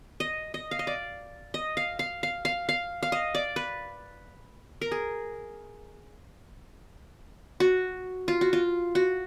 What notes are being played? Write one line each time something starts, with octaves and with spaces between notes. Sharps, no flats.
D#5
D#5
F5
D#5
D5
D#5
F5
F5
F5
F5
F5
F5
D#5
D5
B4
A#4
G#4
F#4
F4
F#4
F4
F#4